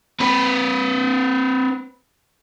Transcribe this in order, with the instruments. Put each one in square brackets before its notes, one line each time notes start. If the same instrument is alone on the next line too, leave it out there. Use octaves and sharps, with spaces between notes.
[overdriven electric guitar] C4 B4